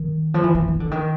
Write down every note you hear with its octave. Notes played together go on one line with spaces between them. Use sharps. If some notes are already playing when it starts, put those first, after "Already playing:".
Already playing: D#3
F3
E3
E3
E3
D3
D#3